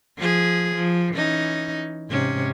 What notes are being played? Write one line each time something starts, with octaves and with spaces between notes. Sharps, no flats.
F3 G#4
F3
E3 C#4 D#4
G#2 C3 C#4